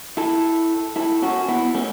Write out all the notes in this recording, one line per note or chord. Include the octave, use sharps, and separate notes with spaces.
E4 A4
E4 A4
C#4 F#4
B3 E4
A3 C#4